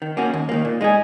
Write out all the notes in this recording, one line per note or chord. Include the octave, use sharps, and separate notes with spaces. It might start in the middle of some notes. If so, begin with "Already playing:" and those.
D#3
A#3 C#4 F#4
D#2
D#3 F#3 A#3
A#2
G#3 D#4 G#4